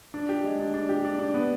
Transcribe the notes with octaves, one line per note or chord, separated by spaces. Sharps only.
D4
G4
G#3
D4
D4
G4
D4
D4
B3